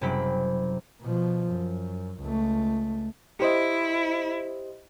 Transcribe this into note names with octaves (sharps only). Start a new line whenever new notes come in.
F#1 C3 F#3 G3 G5 B5
B2 F3
F#2
C#2 A3
E4 G4 C5 D#5